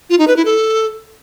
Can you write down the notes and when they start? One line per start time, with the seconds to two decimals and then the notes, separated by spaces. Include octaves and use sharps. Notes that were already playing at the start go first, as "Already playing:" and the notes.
0.10 F4
0.19 D#4
0.28 B4
0.36 E4
0.45 A4